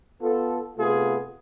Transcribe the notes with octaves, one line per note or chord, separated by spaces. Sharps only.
B3 F4 A4
C3 A3 B3 F4 G#4